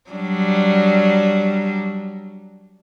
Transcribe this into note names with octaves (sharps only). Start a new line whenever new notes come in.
F#3 G3 D4